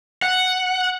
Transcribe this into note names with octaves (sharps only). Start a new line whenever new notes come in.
F#5